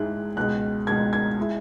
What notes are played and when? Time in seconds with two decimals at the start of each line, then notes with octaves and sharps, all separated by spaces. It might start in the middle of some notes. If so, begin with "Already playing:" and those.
Already playing: G#2 G#3 E4 F#6
0.37 C#2 B2 G#3 F#6
0.87 C#2 B2 G#3 G#6
1.13 G#6
1.40 G#3 E4